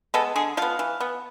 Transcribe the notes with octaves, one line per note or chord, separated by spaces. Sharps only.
G#3 B3 A4
D3 G#4
F3 B3 F5
E3
B3